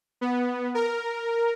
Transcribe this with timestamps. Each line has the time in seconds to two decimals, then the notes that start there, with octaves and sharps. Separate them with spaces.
0.21 B3
0.75 A#4